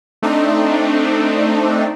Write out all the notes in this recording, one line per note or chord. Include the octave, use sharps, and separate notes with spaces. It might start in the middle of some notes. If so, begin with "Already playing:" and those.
A3 C4 D4 D#4